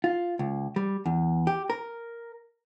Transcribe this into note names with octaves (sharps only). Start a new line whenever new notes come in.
F4
C#2
G3
E2
G4
A#4